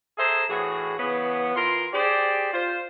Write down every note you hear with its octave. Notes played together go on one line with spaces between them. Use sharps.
G#4 A4 C5 E5 A#5
A2 E3 F#4 G#4
C#3 E3 B3
E3 F4 A#4 C6
G4 G#4 C5 D5
F4 C5